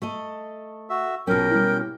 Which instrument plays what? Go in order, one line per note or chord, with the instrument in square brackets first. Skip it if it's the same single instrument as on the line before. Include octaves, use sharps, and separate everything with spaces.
[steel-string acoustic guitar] A3 A4 D#5
[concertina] F#4 E5
[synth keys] A#1 F#3 [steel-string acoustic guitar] B2 C#4 [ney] A#4 [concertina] G5
[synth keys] G3 E4